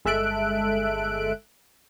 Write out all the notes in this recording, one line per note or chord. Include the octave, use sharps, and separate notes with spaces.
G1 G#3 A4 E5 F#6 D7